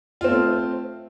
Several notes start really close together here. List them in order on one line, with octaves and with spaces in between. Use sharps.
F4 C4 A3